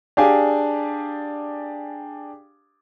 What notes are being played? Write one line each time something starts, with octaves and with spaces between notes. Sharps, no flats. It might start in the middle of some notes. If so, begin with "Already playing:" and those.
D4 G4 G#4 D5 F5 G#5